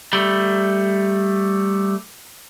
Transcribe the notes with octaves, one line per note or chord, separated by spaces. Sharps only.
G3 A3